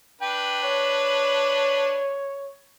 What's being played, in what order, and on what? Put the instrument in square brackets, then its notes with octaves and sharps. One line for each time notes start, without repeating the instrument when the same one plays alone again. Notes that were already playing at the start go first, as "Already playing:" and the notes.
[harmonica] D4 B4 [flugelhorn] G5
[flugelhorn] C#5